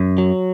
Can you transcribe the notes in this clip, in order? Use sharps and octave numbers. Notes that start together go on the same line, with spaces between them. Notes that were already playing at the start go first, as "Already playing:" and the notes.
Already playing: F#2
F#3